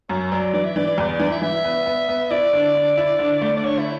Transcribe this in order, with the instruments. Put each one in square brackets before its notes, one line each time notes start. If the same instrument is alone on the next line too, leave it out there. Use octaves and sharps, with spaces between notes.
[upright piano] F#2 [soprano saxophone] C#5
[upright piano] F#3 [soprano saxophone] D5
[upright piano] E3 [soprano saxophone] D5
[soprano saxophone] E5
[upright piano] E3 [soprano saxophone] D5
[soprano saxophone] D5
[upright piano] E2 [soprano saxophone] D5
[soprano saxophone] D5
[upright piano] E3 [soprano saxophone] D5
[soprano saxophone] E5
[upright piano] E3 [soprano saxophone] E5
[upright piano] B3
B3
B3
[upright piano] E4 [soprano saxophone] D5
[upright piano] D3
D3
E4
D3
A3
[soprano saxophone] D5
[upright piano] D3 [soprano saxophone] C#5
[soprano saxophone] E4